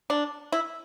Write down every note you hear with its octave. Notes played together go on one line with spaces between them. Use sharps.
D4
E4